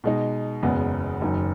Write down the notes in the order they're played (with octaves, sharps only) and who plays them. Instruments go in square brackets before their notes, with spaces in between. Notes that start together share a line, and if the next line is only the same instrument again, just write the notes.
[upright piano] B2 G#3 D#4
F#1 E2 C#3 G#3 B3
F#1 F#2 D#3